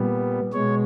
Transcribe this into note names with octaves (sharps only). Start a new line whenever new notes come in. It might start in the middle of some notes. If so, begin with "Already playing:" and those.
Already playing: A#2 G3 B3
B2 G#3 C#5